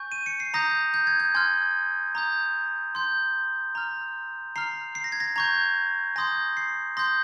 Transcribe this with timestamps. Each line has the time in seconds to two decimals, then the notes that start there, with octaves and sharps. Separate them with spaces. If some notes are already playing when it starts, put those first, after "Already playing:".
Already playing: G#5 C#6 G6
0.12 D#7
0.26 C#7
0.40 C7
0.54 A#5 D#6 G6 A#6
0.94 G6
1.07 G#6
1.20 G6
1.34 G#5 C6 F6 G#6
2.15 A#5 D#6 G6
2.95 C6 G6
3.75 A#5 F6
4.56 A#5 F6 C7
4.95 C7
5.04 A#6
5.12 G#6
5.20 A#6
5.36 A#5 C#6 G6 G#6
6.16 G#5 C6 D#6 G6 A#6
6.57 C7
6.97 C6 D#6 G6 A#6